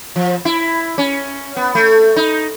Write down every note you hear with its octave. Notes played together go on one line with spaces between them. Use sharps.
F3
E4
C#4
B3
A3
D#4